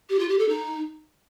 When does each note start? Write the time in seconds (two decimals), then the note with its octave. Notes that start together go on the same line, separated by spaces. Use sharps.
0.09 G4
0.19 F4
0.29 G4
0.39 A4
0.49 D#4